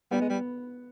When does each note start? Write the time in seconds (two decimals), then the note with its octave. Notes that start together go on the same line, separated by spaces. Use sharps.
0.11 G3 B3
0.21 G#3
0.29 G3